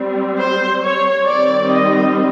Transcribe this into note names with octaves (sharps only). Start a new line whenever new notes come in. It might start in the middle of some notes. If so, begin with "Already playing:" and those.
Already playing: G3 C4
C5
C#5
D#3 G3 C4 D5
D#5